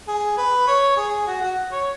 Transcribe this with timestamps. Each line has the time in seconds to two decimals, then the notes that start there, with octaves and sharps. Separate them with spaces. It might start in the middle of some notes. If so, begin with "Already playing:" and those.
0.08 G#4
0.37 B4
0.67 C#5
0.97 G#4
1.27 F#4
1.42 F#4
1.72 C#5